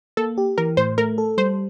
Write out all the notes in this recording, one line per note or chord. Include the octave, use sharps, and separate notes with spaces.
A#3 A4
G4
E3 A#4
A2 C5
A3 A#4
A4
G3 C5